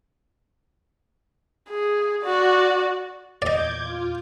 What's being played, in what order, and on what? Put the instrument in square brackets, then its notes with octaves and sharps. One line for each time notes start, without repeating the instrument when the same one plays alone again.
[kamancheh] G#4
F#4 D5
[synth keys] E2 A#2 [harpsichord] D5 D#5 [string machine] D6 G6 G#6
[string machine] F4